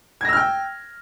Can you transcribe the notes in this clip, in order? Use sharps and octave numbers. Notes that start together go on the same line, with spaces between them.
G5 E6 F6 G#6 A#6